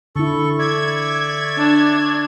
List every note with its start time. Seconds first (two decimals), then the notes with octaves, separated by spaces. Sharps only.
0.16 D3 E4 A4 C#6
0.59 D5 E5 C#6 G#6
1.58 D4